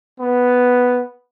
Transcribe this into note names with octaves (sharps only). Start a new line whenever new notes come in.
B3